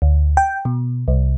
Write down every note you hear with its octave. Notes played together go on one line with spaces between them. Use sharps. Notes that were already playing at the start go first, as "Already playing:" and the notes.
D2
G5
B2
C2